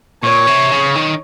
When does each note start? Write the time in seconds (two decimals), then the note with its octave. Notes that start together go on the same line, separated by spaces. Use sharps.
0.23 A#2 C#5
0.47 C3
0.71 C#3
0.95 D#3